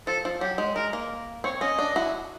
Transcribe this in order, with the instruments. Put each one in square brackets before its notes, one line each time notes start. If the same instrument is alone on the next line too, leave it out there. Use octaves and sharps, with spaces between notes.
[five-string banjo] F3 [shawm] A4
[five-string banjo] F3
[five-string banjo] F#3 [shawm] G4
[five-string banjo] G#3
[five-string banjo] G#3 [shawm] A#4
[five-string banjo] A#3
[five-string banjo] C4 [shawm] C#5
[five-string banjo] C#4 [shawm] D#5
[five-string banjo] D4
E4 F#4